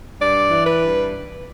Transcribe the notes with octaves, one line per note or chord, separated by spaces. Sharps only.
G2 D5
E3
B4
G2